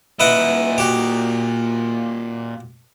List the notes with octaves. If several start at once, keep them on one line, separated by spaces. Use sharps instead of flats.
A#2 E4 B4 D#5 F#5
F#4 G4